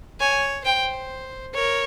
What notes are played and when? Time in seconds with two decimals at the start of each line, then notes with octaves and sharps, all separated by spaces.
0.20 C#5 G#5
0.65 C5 G5
1.54 A#4 C#5